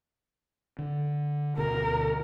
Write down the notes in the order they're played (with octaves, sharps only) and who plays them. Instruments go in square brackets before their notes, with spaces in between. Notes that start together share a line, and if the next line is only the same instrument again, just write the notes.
[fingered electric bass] D3
[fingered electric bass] D2 B2 [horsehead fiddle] A#4